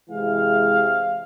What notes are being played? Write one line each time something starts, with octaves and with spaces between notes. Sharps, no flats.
C3 E3 G#3 F5